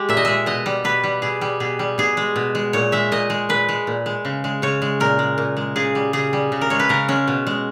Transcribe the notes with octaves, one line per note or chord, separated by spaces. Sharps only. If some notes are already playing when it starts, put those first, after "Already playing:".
Already playing: G#3 G4
A#2 E5
D#5
G#3 E5
B2 D#5
G3
B2 B4
G3
B2 G#4
G3
B2 G#4
G3
B2 G#4
G#3
B2
G#3
A#2 C#5
G#3 E5
A#2 D#5
G#3
A#2 B4
G#3
A#2
G#3
C#3
G#3
C#3 C#5
G#3
A#2 A#4
G#3
A#2
G#3
C#3 G#4
G3
C#3 G#4
G3
C#3
A#4
G#3 C#5
B4
C#3 A#4
G#3 C#4
B2
G#3